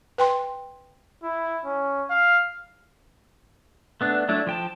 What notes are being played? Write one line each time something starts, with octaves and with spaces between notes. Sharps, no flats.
B4 G5 C6
E4
C#4
F5
A3 B3 D4
F#3 A3 D4 E4
F3 G5 A5